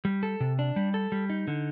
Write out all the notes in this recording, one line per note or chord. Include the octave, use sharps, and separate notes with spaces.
G3
A4
C3
D4
G3
A4
G3
D#4
D3